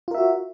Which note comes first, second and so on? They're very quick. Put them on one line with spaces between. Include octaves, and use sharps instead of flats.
F4 A#4 E5 F#4